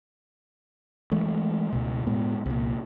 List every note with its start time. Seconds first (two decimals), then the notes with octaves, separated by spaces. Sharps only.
1.12 E3 G#3 A3
1.72 C#2 B2
2.07 A2 G#3 B3
2.46 C2 A#2